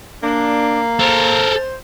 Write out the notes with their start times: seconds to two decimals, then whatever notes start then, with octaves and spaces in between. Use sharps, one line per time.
0.23 A#3 D4
1.00 A4 A#4 C5